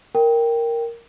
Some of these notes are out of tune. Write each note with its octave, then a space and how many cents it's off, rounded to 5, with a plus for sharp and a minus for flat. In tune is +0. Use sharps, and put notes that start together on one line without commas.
A#4 +0 G5 +0